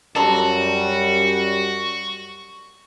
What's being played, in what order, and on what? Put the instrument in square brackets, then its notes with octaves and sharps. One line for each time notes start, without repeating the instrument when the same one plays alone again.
[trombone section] F#2 G3 [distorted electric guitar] F#4 [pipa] A4 A#5 C6